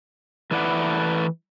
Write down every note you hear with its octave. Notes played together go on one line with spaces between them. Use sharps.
E3 A3 E4 B4 D5 F#5